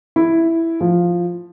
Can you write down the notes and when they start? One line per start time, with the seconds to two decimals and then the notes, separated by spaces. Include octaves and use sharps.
0.16 E4
0.81 F3